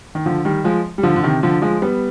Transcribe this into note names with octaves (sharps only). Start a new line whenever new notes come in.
D#3
D3 F3
D#3 G3
F3 G#3
G3
D3 F3
D3
C3 D#3
D3 F3
F3 G#3
G3 B3